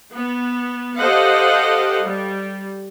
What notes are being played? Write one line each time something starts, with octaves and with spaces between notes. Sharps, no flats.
B3
G4 A4 C5 D#5 F5 F#5
G3